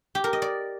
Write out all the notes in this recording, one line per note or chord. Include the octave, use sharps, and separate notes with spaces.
G4
A#4
D#5
D5